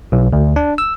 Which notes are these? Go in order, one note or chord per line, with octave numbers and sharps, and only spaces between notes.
B1
D2
D4
E6